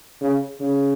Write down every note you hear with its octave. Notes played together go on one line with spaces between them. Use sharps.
C#3
C#3